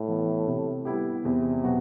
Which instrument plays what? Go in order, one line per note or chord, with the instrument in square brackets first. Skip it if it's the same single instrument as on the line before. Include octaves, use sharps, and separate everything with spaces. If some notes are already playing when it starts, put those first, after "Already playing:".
Already playing: [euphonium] A2
[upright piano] E3 B3
C3
G3 B3 E4 G4
[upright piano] E2 [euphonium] C3
[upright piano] B2 F#3 B3 F#4